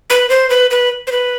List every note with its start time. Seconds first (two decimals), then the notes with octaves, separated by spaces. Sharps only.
0.10 B4
0.30 C5
0.50 B4
0.71 B4
1.07 C5
1.12 B4